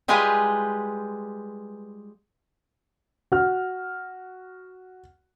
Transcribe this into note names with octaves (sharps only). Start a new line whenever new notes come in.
G3 G#3 F4 G4 B4 G#5
F#4 F6